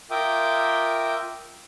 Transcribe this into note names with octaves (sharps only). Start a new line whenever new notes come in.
F4 A#4 E5 G5 D6 D#6